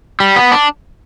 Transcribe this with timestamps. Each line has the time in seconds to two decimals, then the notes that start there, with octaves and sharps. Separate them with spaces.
0.20 G3
0.36 B3
0.52 D4